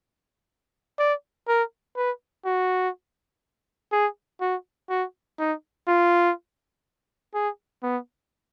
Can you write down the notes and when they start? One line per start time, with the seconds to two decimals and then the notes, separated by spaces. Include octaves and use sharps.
0.99 D5
1.48 A#4
1.97 B4
2.45 F#4
3.92 G#4
4.41 F#4
4.90 F#4
5.39 D#4
5.88 F4
7.34 G#4
7.83 B3